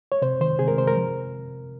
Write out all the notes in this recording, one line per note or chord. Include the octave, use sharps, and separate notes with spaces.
C#5
C3 C5
D#3 C5
C3 G#4
A#4
C3 C5
A#4
F3